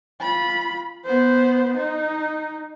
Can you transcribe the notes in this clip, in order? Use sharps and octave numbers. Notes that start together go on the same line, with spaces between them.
F4 B5
B3 C5
D#4